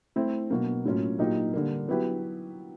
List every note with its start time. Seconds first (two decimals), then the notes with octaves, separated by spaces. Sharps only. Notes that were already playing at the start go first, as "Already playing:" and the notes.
0.16 A3 C4 E4
0.50 B2 F#3 A#3
0.85 A2 F#3 A#3 C#4 F4
1.19 A#2 F#3 A#3 D#4 G4
1.53 D3 G3 A#3
1.88 F#3 B3 E4 G4 B4